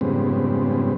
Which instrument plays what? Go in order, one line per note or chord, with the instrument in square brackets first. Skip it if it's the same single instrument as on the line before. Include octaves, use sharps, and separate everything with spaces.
[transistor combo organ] F2 G#2 C#3 G3 B3 C4